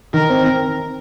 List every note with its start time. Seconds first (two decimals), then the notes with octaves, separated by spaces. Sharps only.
0.14 D#3 A#4
0.29 C4
0.46 C4